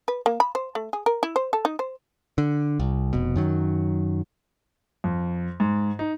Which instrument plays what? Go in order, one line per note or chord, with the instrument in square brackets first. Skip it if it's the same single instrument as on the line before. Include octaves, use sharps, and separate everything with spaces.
[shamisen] B4
A#3
B5
C5
A3
G#4
A#4
E4
C5
A4
D#4
C5
[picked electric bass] D3
C2
F1 B2
F#2 D#3 F#3
[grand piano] F2
G#2
D#4